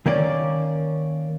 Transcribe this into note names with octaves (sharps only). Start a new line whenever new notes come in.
D#3 A#3 C#4 D5